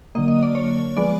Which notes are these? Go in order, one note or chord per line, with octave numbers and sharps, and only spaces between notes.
D3 F#3 A#3 D#5
D#5
D5
C#5
F3 G#3 B3 D5